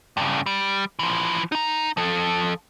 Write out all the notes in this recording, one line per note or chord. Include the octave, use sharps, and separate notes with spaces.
G2 C#3
G3
E3 F3
D#4 A#5
F3 A4